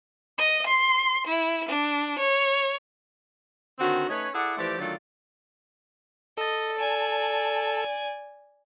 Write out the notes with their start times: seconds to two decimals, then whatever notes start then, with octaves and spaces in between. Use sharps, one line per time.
0.38 D#5
0.66 C6
1.27 E4
1.68 D4
2.18 C#5
3.80 D3 D#3 C4 C#4 F#4
4.08 A3 C#4 D#4 B4 C#5
4.34 E4 G#4 A4 D5 F#5
4.58 E3 F3 A3 G4 C5 D5
4.78 D3 D#3 F#3 A3 F4 D5
6.38 A4 D#5 A5
6.79 D5 G#5